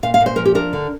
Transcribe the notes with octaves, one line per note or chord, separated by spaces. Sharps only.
A#2 F5
F5
A#2
C5
F3 A#4
G4
D4 A#4
D3